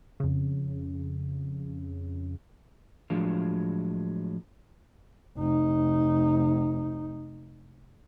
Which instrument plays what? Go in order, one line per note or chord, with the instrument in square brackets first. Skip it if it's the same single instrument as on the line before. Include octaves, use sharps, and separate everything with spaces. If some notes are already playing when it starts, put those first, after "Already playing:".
[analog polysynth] F2 C#3
[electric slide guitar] A2 F3 F#3 G#3 D4 F5
[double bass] F1 D#4